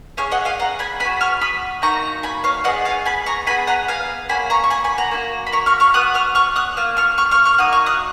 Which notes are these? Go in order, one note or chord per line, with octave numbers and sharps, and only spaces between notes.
C#4 G#4 C#5 F5
D#5 F#5
F5 G#5
F#5 A#5
G#5 B5
B3 G#5 B5
F#4
C#6 F6
B5 D#6
A#3 D#4 F#4 A#5 C#6
G#5 B5
C#5 F5
B3 F4 G#4 D#5 F#5
F5 G#5
G#5 B5
A#5 C#6
B3 F4 G#4 G#5 B5
F#5 A#5
F5 G#5
A#3 C#4 F#4 G#5 B5
A#5 C#6
C#6
G#5 B5
G#5 B5
F#5 A#5
A#3 D#4 F#4
B5
A#5 C#6
C#6 F6
C#6 F6
B3 F#4 D#6 F#6
C#6 F6
C#6 F6
D#6 F#6
A#3 F4 F6
C#6 F6
C#6 F6
C#6 F6
C#6 F6
A#3 D#4 F#4 D#6 F#6
C#6 F6
D#6 F#6